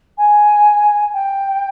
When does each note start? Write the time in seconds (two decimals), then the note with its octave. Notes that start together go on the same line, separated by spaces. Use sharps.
0.18 G#5
1.13 G5